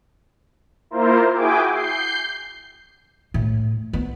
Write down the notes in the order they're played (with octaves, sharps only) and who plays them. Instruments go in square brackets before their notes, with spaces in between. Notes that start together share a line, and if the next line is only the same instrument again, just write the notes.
[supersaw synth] A#3 E4 F4 A#4 C5
E4 F#4 G#4 G5 G#5 D6
G6 C7
[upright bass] A2
B3